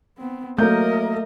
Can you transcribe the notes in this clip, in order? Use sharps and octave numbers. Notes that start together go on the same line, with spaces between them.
B3 C4
F#3 A3 A#3 A#4 D#5 G6